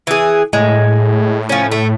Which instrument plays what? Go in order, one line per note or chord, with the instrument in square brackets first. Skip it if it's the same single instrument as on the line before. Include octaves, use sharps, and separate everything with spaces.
[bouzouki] E3 G#4
[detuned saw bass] A2 [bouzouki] G#3
[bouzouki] F3 C#4
A3